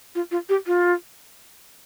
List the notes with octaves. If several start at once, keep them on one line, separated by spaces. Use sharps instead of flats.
F4
F4
G4
F4